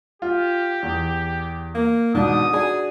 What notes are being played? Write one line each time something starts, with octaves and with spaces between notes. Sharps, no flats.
F4 G4
E2
A#3
G#2 B2 D4 D#6
D4 F#4 G#4 G#5